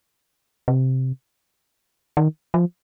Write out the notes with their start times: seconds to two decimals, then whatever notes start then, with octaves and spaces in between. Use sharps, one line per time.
0.68 C3
2.17 D#3
2.54 F3